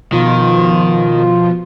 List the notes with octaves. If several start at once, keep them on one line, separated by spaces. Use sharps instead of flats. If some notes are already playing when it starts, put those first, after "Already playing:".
B2 D#3 F3 F4